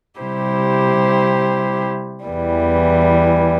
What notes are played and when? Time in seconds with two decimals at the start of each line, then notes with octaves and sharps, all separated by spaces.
0.19 C3 G3 E4 G4 C5
2.26 E2 E3 G3